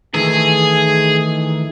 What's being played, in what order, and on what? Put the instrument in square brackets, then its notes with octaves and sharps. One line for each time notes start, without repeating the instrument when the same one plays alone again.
[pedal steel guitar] D#3 E3 A3 [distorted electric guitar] G#4